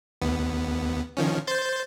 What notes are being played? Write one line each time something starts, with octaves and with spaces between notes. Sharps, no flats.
D#2 B3
D#3 F3 C#4
C5 G6 A6